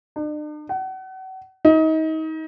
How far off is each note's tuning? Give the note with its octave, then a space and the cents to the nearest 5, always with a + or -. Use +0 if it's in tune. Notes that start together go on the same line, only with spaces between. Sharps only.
D4 +45
F#5 +35
D#4 +30